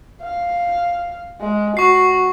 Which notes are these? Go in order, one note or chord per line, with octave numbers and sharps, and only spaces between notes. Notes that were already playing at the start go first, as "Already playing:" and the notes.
F5
G#3
F#4 C#6 C7